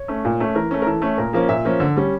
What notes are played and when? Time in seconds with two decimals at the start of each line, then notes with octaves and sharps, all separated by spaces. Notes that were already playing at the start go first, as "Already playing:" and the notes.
Already playing: C#5
0.08 A3 C#4
0.25 A#2
0.40 A3 C#4
0.55 E3 A#4
0.71 A3 C#4
0.82 A#4
0.86 E3 A4
1.02 A3 C#4
1.18 A#2 A#4
1.33 F3 A#3 C#4
1.49 A#2 E5
1.65 F3 A#3 C#4
1.80 D3
1.97 G3 C#4